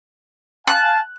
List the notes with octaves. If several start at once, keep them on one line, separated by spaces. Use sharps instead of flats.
F5 G#5 A5 F#6